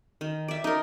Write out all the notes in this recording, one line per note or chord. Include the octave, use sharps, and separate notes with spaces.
D#3
D5 E5
D#4 A#4